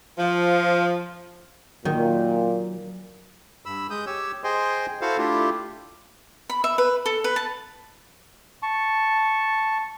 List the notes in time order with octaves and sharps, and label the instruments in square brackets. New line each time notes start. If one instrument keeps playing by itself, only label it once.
[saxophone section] F3
[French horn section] A#2 [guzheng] D#3 [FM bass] F#3
[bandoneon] G2 B5 E6
G#3 D#6 G6
G4 C#5 E6
G#4 C5 D#5 G5 G#5 C6
E4 F#4 A4 C5 F5 F#5
A3 D4 E4 F4 G4
[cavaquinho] B5
E5
B4
A4
B4
A5
[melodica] A5 C#6